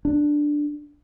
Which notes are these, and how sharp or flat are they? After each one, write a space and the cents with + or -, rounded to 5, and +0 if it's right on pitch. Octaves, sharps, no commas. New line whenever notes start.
D4 +5